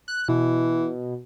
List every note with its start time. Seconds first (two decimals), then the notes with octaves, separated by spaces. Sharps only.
0.08 F#6
0.28 B2 E3